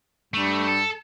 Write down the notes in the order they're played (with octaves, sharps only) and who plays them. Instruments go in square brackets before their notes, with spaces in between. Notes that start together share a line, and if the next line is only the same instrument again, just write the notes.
[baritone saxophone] G2 [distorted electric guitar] A3
[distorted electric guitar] A4